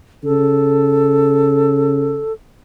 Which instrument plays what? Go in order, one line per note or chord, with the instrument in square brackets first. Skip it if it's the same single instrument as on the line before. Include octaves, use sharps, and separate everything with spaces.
[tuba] C#3 [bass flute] A4